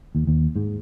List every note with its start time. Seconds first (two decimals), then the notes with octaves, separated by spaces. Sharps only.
0.15 D#2
0.27 D#2
0.56 G#2